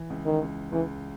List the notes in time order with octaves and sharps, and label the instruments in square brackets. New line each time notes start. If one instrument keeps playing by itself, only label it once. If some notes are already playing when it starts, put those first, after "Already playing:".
Already playing: [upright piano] E3
C#2
[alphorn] D#3
[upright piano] C#2
[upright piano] C#2 [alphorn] E3